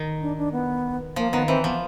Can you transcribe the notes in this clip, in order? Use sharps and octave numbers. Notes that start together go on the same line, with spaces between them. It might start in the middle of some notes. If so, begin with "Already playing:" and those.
Already playing: D#3
D4
D4
B3
F3 A#3
D#3 B3
E3 C4
F3 B3